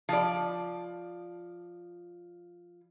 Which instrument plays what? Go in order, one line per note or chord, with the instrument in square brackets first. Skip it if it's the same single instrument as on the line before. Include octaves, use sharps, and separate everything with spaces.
[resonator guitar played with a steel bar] F3 D5